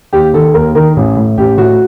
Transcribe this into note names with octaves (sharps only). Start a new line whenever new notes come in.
D#2 G4
D#3 A4
D#2 A#4
D#3 A#4
A1
A2
A1 G4
A2 F#4